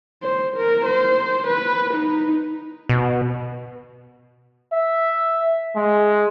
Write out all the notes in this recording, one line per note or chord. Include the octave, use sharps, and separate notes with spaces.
C5
A#4
C5
B4
D#4
B2
E5
G#3